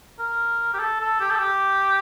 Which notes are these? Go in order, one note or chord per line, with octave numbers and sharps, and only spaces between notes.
A#4
G4
A4
A4
G4
A4
G4